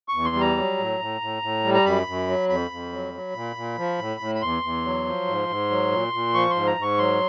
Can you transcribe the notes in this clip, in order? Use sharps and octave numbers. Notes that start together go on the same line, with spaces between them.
C#6
E2
C6
G3
A#5
F#3
A2
A2
A2
A2
G3
A#5
F#2 B5
F#2
F#3
F2 B5
F2
F#3
F#3
A#2
A#2
F3
A2
A2
B5
E2 C6
E2
F#3
F3
G#2
G#2
F#3
A#2
A#2
F3 C#6
C6
G#2
A#5
G#2 C#6
F#3 C6